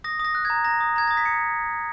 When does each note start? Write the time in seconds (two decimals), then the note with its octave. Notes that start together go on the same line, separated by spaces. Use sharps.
0.04 D#6 A#6
0.20 D#6
0.25 A#6
0.35 F#6
0.45 G#6
0.50 A#5
0.65 A#5 A#6
0.81 D#6
0.96 A#5 G#6
1.07 D#6 A#6
1.17 B6
1.26 D#6 C#7